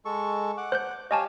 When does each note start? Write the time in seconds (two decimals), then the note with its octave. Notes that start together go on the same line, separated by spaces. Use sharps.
0.05 G#3 A4 C#6
0.57 F#5 D6
0.72 C5 F#6 G6
1.11 G4 C#5 D#5 F5 G#5 A5